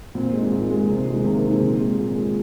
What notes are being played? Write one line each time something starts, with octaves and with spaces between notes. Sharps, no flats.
A#2 C4
G#3 D#4
A#2 A#3
G#3
C3
D#3 G#3
C3 A#3
D#3 G#3 C4
A#2
G#3
A#2
G#3